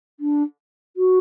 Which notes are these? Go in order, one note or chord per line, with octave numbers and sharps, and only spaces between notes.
D4
F#4